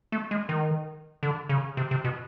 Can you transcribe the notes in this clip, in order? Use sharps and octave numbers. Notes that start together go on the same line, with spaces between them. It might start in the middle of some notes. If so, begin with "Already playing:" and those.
A3
G#3
D#3
D3
C#3
C3
C3
B2